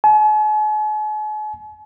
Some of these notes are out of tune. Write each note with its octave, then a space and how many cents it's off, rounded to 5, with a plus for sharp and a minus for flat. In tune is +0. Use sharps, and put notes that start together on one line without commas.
G#5 +45